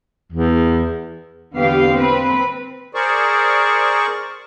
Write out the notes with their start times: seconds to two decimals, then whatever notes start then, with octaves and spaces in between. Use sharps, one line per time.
0.32 E2
1.56 E2 D3 B3 G4 F5
1.91 C4 B4
2.94 G#4 A#4 C5 D5 C#6